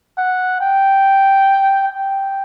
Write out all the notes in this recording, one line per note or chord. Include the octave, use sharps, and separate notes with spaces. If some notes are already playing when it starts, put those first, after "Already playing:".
F#5
G5
G5